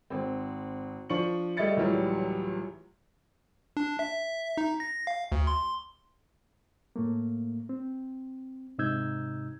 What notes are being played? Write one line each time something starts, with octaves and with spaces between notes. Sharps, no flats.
G#1 C4
F3 D4 C#6 C#7 F#7
G3 A3 D#5 E5 A6 C#7
C#2 A2 E3 F#3 G3
D4
E5
D#4
A#6
F5
D2
C6
A2 A3 A#3
C4
G#2 C3 D#4 E6 G6 G#6